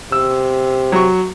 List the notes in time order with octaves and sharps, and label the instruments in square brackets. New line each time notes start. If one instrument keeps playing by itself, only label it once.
[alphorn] C3 [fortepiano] E6
[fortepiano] F#3 C#6